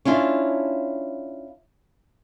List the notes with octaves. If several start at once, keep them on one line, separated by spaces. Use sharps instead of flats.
C#4 D4 E4 F4